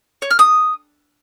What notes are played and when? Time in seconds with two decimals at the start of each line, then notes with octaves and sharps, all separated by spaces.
0.22 C#5
0.31 F6
0.39 D#6